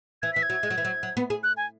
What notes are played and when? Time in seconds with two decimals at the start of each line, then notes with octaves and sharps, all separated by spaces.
0.22 E3 G#6
0.33 E3 B6
0.43 G#6
0.50 F#3
0.63 G#3
0.70 F#3
0.78 E3
0.85 F#3
1.03 F#3
1.17 B3
1.30 G#4
1.43 F#6
1.57 G#5